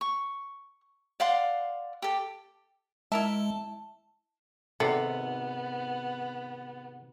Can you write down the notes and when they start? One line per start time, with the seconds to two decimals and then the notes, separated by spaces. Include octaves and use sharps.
0.01 C#6
1.20 D5 F5 F#5 C6
2.02 G4 A4
3.12 G#3 E4 A#4 E5 A5
4.80 G#1 C3 B3 A4 D5 F#5